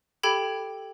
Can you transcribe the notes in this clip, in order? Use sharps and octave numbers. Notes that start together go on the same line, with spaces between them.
G4 A4 G5 B5 G#6